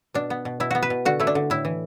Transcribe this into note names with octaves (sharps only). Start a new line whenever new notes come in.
B2 D4
B3
B2
B2 E4
B3 F#4
B4
B2
D3 F#4
A3 E4
D4
D3
A2 E4
E3